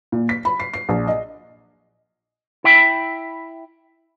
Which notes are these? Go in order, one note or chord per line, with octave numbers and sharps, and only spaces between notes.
A#2
B6
B5
C7
C7
A#1
D#5
E4 E5 G5 B5